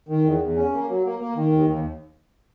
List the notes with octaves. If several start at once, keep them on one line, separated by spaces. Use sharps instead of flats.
D#3
E2
E2
C#4
A#3
F#3
A#3
A#3
D#3
D#2
D#2